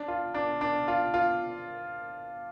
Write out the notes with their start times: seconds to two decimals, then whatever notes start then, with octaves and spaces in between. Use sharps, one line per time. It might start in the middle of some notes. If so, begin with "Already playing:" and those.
Already playing: D4
0.08 F4
0.34 D4
0.61 D4
0.88 F4
1.14 F4